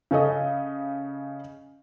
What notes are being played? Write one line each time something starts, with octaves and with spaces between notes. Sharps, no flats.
C#3 C#4 A4 D#5